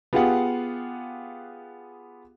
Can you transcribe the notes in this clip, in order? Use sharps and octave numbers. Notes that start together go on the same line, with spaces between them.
B3 F4 G4 G#4 F5 F#5